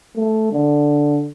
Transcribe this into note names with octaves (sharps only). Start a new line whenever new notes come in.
A3
D3